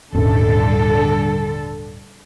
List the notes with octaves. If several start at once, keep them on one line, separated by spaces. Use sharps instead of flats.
D#1 G#1 D3 G3 C#4 A4